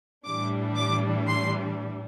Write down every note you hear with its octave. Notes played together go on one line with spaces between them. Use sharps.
A2 E3 G3 D4 D6
D6
C6